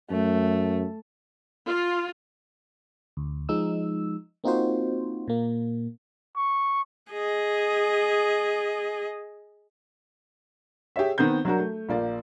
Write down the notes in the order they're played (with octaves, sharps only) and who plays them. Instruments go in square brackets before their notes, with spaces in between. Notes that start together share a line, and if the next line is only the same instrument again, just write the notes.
[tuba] F#2 [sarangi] A3
[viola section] F4
[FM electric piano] D2
F3 G#3 D#4 E6
A#3 C4 D#4 F4 F#4 C5
A#2 A#3
[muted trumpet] C#6
[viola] G#4 D#5
[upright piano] G4 G#4 C#5 E5
D#3 B3 C4 A#4 G6
F#3 D4 F#4 A#4
A3
A#1 A#3 D5